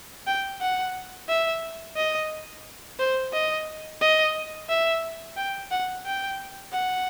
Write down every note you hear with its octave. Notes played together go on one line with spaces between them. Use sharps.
G5
F#5
E5
D#5
C5
D#5
D#5
E5
G5
F#5
G5
F#5